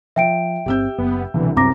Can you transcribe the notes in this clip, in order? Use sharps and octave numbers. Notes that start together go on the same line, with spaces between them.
F3 E5 G5 D7
G1 A#2 C4 G4 E6 G6
F#1 B3
C2 B2 D3 E3
C2 F#2 F#3 B3 C4 A#5 D6 A#6